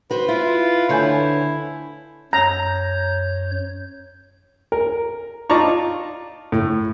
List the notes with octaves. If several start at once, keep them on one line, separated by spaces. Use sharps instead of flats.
F#4 B4 C5
E4 F4
D2 D3 E4 C#5 G#5 G6 C7
F#2 C#5 A#5 G6
A#4
D#4 F4 D5 A5 A#5 C#6
A2